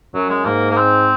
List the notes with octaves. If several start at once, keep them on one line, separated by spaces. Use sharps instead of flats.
F#2 F#3
G#3
G#2 A#3
A#3
C4